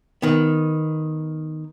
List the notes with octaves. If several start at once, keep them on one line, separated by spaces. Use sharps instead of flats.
D#3 B3